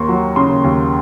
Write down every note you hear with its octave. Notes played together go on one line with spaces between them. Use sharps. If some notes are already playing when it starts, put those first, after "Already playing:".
Already playing: D#2 A#3 C6 C#6
F#3
C#3 C6
D#2